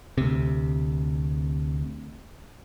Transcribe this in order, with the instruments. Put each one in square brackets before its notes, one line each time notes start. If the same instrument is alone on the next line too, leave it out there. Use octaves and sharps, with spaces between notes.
[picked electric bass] D2 C3